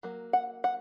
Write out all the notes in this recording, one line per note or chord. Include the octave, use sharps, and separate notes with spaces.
F#3 A#3
F#5
F#5